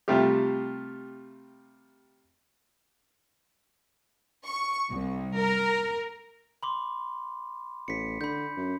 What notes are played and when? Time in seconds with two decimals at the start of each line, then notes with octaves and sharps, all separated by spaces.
0.08 C3 G3 A3 F4 G4
4.45 C#6
4.91 C2
5.39 A#4
6.63 B5 C6 D6
7.88 A1 B6 C#7
8.21 D3 B5 G6
8.57 F#2